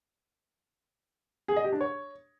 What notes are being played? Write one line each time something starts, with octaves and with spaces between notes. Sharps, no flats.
G#4
D#5
G4
D4
C#5